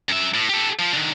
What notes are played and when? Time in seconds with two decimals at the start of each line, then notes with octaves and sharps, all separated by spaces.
0.09 F#2 E5
0.34 A2
0.49 G4 A4
0.79 F3
0.93 D3 D#3